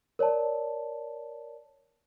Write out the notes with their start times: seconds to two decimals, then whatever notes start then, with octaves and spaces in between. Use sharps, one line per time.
0.19 A#4 C#5 D5 A5